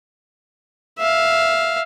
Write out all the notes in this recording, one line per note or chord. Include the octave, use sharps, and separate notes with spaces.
E5 F5